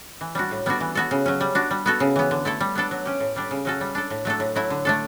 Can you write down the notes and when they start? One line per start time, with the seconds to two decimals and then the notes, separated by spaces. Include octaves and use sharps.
0.21 E3
0.35 G3 D4 F#4
0.51 A2
0.66 G3 B3 D4 F#4
0.80 E3
0.95 B3 F#4 A4
1.11 C#3
1.26 F#3 C#4
1.41 G3
1.55 D4 F#4
1.71 G3
1.86 B3 F#4 A4
2.00 C#3
2.16 E3 B3
2.31 D3
2.45 A3 E4 A4
2.60 G3
2.75 B3 D4 A4
2.91 F#3
3.05 C#4 G4
3.20 A2
3.36 G3 D4 G4
3.51 C#3
3.65 F#3 C#4 F#4 A4
3.81 G3
3.95 D4 A4
4.10 A2
4.25 F#3 A3 D4 A4
4.40 A2
4.56 F#3 A3 E4
4.70 D3
4.85 A3 D4 A4